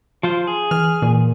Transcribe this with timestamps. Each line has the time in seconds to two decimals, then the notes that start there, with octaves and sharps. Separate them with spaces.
0.23 F3 F4 C5
0.47 G#4
0.71 E3 F6
1.02 A#2 E3